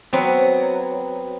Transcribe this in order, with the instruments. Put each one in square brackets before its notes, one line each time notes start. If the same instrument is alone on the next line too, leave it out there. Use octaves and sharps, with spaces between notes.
[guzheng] F#3 B3 C4